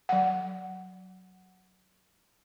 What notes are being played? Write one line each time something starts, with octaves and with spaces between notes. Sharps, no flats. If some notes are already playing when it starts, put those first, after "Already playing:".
F#3 F#5